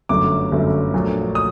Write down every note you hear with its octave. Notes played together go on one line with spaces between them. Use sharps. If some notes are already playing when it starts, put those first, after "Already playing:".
G1 F#2 D3 F#3 A3 D6
G1 F#2 D3 F#3 A3
A#1 A#2 F#3 A3
D#6